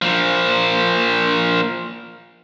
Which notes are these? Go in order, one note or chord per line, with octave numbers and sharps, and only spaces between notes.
A#2 F3